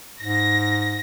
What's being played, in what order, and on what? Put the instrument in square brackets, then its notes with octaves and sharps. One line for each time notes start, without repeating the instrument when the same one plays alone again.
[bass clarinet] G#2 [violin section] A#6